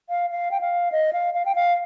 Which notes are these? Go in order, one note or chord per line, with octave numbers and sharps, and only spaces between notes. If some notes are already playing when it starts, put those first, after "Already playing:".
F5
F5
G5
F5
D#5
F5
F5
G5
F5